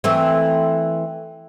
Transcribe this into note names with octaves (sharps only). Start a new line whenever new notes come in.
E3 A3 C4